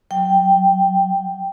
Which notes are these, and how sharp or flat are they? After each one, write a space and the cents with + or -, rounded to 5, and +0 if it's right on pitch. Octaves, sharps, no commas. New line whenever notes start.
F#3 +0 G5 +0